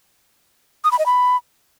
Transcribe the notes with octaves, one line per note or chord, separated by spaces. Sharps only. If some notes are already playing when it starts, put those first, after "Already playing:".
D#6
B5
D#5
B5